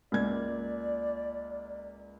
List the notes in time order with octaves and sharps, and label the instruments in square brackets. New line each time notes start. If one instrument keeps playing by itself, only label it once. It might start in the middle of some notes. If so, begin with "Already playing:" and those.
[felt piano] C#2 A#3 G#6 [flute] D5